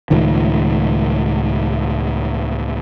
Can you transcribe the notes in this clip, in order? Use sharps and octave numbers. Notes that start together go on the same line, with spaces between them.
C#2 A2 D#3 F3